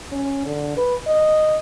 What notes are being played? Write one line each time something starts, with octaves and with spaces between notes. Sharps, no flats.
C#4
D3
B4
D#5